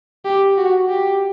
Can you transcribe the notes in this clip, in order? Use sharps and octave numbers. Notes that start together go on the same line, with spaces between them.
G4
F#4
G4